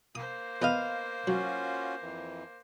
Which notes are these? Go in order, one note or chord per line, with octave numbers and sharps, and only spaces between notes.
A#3 C5 D#6
E2 B4 D#5 F5
F#3 C#4 F4 F#4
F2 E3